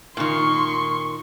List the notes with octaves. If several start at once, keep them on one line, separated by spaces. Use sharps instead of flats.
A#2 D#3 C6 C#6